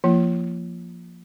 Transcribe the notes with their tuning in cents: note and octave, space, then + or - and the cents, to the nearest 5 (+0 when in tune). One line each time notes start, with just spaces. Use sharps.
F3 +0 A#3 +0 F4 -40